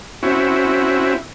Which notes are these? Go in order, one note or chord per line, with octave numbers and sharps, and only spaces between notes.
C4 C#4 E4 F#4